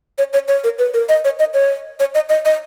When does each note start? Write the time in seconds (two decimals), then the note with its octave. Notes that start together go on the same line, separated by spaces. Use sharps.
0.18 C#5
0.33 C#5
0.48 C#5
0.64 A#4
0.79 B4
0.94 A#4
1.09 D#5
1.25 C#5
1.39 D#5
1.54 C#5
2.00 C#5
2.15 D#5
2.29 D#5
2.45 D#5